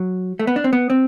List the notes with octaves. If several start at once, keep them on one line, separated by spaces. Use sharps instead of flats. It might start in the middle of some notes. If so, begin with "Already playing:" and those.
Already playing: F#3
A3
B3
D4
C4
B3
C4